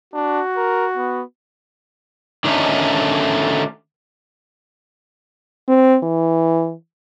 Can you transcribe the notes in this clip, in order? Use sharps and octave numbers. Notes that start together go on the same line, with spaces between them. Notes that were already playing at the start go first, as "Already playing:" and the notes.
D4 F#4
A#4
B3
D3 D#3 A3 C#4 D#4
C4
E3